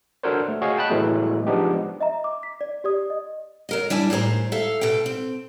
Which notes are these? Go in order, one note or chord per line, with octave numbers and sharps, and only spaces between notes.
D4 F#4 A4 A#4 C5 C#5
A3
F#4 G#4 C#5 D#5 F5
G5 A5 B5 F#6
A2 E3 F#3 G#3 A3 B3
F3 G#3 B3 D4 D#4 G4
D#5 E5 A#5
D6
B6
D5
G4 D5 D#6
D#5
F#3 A#4 D#5
G3 D4 E4 G#5
A2 D#3 G#4 A4 C5 A#5
A4 E5 F5
B2 A4 G5
C4